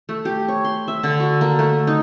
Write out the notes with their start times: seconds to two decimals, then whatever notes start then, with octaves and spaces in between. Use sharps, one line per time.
0.09 A3
0.25 G4
0.48 C#5
0.64 C6
0.88 E5
1.03 D3
1.20 F#4
1.41 A#3
1.59 A3
1.87 D#4